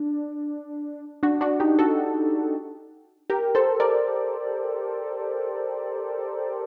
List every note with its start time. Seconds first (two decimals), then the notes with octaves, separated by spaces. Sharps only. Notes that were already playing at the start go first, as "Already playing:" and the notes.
Already playing: D4
1.23 D4 F#4
1.41 D4 F#4
1.60 D#4 G4
1.79 F#4 A4
3.30 G4 A#4
3.55 A4 C5
3.80 A#4 D5